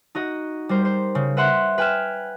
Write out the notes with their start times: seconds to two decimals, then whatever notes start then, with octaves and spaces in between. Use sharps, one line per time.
0.15 D#4 F#4 D#5
0.69 G3 A#4 C5
0.85 C5
1.15 C#3
1.37 B4 E5 F#5 C6 F#6
1.78 B4 G5 G#5 F6 E7